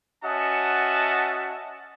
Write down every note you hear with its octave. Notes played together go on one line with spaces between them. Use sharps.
C#4 F#4 D#5 E5 F#5 A5